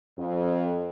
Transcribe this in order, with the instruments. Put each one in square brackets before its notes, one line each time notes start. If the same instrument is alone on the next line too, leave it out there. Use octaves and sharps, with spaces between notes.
[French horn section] F2